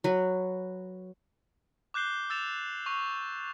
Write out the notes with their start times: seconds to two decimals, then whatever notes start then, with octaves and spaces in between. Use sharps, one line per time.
0.04 F#3 B4
1.94 D6 F#6 G6 C7 G7
2.30 E6 A6 E7 F7
2.86 C#6 F7